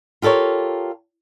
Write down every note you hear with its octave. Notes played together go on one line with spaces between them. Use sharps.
F4 G4 A4 A#4 C#5